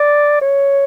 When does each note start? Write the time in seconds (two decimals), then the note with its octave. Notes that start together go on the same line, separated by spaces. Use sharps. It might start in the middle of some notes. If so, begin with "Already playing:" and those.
Already playing: D5
0.41 C#5